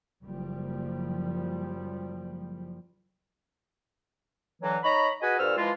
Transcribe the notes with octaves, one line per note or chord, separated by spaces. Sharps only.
F#1 F3 G3
D3 E3 F#3
D#4 C#5 A#5 B5
F#4 G#4 B4 D#5 G#5
G2 A#2 A4 C5 E6 F6
E3 F3 G#3 E4 F4